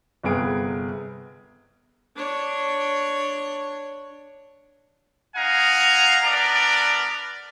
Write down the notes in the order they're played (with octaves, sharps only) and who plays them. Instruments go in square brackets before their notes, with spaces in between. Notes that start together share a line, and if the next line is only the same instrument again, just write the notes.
[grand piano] G1 C3 B3 G#4 D7
[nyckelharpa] D4 C#5
[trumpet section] D#4 F5 F#5 G#5 A#5
B3 D4 A#4 D5